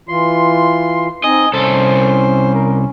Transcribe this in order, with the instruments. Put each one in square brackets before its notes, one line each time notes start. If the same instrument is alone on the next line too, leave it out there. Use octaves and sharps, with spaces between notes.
[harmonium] E3 F4 [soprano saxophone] C6
[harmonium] C4 D#4 [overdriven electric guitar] D#5 [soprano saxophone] G#5
[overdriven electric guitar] C2 A4 [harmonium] C#4 [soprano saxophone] C5
[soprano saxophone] A#4